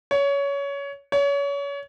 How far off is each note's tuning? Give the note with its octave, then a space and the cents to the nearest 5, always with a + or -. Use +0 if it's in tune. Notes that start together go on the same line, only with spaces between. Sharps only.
C#5 +20
C#5 +30